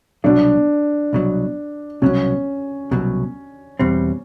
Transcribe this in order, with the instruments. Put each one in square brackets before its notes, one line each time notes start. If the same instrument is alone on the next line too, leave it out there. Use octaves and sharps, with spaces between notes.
[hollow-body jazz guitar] C2 B2 F#3 [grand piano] D4
[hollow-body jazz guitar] C2 B2 F#3
[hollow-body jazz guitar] C2 B2 F#3 [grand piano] C#4
[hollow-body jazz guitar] C2 B2 F#3
E2 B2 G3 C4